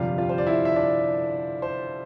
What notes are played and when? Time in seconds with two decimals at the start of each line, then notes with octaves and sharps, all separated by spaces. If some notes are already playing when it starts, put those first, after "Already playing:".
Already playing: G1 F2 C3 G3 F4 F5
0.18 F4 F5
0.29 C5
0.38 D5
0.47 E4 E5
0.65 E5
0.76 D4 D5
1.62 C5